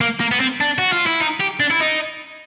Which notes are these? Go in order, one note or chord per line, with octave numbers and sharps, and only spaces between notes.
A#3
A#3
B3
C4
D4
F#4
F4
E4
D#4
G4
D4
E4
D#4